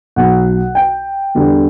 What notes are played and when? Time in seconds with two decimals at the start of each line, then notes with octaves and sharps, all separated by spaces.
0.16 B1 B2 F#3 F#5
0.75 G5
1.35 E2 D3 G3